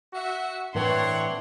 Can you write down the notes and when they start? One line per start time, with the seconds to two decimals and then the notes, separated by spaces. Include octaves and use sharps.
0.13 F#4 E5
0.75 A2 E3 C4 D4 C#5 F#5 C6